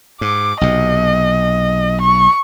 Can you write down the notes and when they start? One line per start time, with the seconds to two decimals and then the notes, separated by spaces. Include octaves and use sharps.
0.21 G#2 D6
0.61 B1 C3 D#5
2.01 C#6